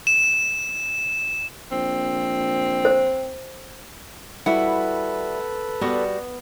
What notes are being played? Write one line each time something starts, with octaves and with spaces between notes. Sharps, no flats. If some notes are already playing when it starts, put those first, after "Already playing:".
E7
A#1 C4
C5
G3 E4 F#4 A4 B4 F#5
G3 B3 F#4